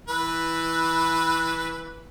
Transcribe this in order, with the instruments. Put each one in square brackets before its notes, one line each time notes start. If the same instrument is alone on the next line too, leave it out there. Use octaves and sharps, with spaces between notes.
[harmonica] E3 B4